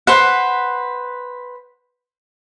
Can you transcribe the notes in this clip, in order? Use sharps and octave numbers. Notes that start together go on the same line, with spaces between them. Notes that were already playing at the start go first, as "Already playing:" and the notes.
B4 C5 F#5